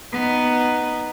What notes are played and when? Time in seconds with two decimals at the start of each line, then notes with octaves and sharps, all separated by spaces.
0.12 B3 D#4